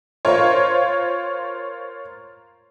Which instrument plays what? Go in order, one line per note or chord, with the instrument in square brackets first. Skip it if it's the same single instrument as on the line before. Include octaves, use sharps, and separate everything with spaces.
[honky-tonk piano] F4 A#4 C5 C#5